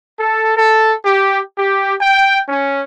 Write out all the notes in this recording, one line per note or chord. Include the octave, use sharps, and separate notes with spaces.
A4
A4
G4
G4
G5
C#4